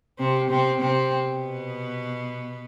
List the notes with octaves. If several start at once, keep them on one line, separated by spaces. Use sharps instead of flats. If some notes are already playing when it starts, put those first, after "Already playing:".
C3 C4
C3 C4
C3 C4
B2 B3